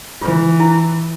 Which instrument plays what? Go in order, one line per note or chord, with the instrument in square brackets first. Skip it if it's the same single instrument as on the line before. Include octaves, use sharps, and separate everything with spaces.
[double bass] E3 [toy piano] F4
[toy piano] E4